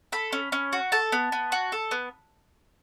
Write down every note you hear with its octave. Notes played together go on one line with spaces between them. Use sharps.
A4 B5
C#4
C#4
F#4
A4 A5
B3
B3
F#4
A4
B3